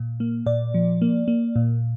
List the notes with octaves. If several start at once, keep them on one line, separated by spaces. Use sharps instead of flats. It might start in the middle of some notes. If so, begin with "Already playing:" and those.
Already playing: A#2
A#3
A#2 D5
F3
A#3
A#3
A#2